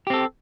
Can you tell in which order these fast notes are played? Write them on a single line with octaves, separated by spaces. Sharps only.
G4 C4 A4